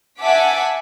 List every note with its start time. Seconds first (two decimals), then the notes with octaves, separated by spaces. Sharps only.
0.19 E5 F#5 G#5 A5 D6 B6